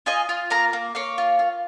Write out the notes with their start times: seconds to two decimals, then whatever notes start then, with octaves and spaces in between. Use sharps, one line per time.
0.06 F4 D#5 G#5
0.29 F4
0.50 A#3 F5 A#5
0.73 A#3
0.95 A#3 C#5 F5
1.18 F4
1.39 F4